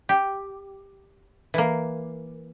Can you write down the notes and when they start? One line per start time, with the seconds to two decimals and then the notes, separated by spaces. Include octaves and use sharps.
0.09 G4
1.54 E3 A#3